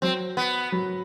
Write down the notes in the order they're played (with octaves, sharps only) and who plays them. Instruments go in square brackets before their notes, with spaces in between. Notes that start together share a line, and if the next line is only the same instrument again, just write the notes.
[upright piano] F#3 [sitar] C4
[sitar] B3
[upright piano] F#3